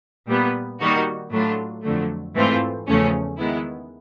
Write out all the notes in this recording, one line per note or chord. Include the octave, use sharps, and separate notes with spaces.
A#2 G3 B3
D#3 G3 A#3 D#4 F#4
A2 F#3 A3 D4 F4
F2 D3 F#3 A3
G#2 E3 A3 C4 F4
E2 C#3 F3 A3 C#4
D#3 G#3 B3 E4